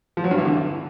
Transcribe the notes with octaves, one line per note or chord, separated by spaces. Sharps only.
F3
F#3
G2
E3
D3